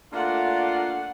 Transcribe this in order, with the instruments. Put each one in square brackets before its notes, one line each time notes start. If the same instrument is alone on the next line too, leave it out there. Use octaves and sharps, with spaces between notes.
[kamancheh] A3 F#5 [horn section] A#3 D4 F4